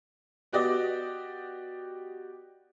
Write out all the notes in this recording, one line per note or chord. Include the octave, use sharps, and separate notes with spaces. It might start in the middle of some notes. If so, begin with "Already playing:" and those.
B3 F#4 G4 D5 D#5